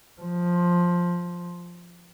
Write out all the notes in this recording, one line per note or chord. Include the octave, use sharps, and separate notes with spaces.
F3